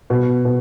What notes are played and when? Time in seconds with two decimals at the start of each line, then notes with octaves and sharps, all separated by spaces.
0.10 B2
0.45 B2